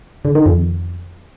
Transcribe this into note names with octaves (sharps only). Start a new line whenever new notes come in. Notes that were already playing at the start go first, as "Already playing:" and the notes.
D3
D#3
F2